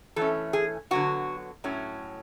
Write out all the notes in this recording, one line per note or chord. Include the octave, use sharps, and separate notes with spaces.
E3 A3 C#4 A4
G#4
D3 F#3 B3 F#4
A2 F#3 C#4